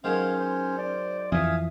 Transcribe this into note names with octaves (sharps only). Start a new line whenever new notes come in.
D#3 F#3 G#3 C#4 C5 F5
C5
D5
F2 E3 E5 F5 G#5 D#6